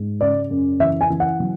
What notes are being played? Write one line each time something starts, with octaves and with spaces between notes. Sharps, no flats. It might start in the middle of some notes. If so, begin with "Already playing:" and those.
Already playing: G#2
C#3 D5
F#2
E3 E5
G#5
E3
F#5
F#3